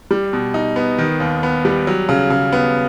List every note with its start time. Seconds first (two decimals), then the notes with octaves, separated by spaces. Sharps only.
0.11 G3
0.33 B2
0.54 D#4
0.76 B3
0.98 D#3
1.20 D#2
1.43 B3
1.65 G3
1.87 F#3
2.09 C#3
2.30 C#3
2.52 B3